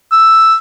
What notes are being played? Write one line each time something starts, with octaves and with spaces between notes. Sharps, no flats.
E6